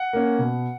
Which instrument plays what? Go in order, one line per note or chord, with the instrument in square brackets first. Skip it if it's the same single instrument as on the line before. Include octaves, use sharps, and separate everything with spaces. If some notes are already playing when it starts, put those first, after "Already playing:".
Already playing: [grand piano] F#5
A#3 C#4
B2